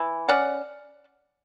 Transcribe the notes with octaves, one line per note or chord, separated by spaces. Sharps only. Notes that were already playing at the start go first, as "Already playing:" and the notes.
Already playing: E3
C#4 D5 F#5